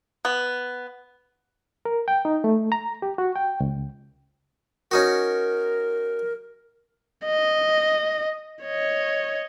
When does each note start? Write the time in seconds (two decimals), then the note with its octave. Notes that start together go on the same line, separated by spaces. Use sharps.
0.25 B3
1.85 A#4
2.08 G5
2.25 D#4
2.44 A3
2.72 A#5
3.02 G4
3.18 F#4
3.35 G5
3.60 C#2
4.91 C#4 D#4 F#4 A#4
7.26 D#5
8.64 C#5 D#5